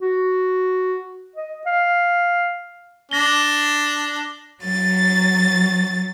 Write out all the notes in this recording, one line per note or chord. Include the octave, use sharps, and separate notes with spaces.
F#4
D#5
F5
D4 A#6 G7
F#3 A6